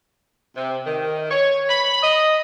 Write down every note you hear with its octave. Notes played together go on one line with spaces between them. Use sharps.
C3
D#3
C#5
B5
D#5